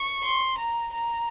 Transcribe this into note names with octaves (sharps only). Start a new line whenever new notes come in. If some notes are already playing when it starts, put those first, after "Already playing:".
Already playing: C#6
C6
A#5
A#5